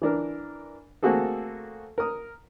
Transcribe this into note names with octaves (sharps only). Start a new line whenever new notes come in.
E3 D4 A#4
A3 A#3 C4 F#4 G#4 A4
A#4 D#6